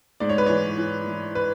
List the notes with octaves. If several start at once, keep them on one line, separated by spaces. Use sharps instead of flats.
G#2 D5
C#5
B4
E3 C#5
E3
E3
B4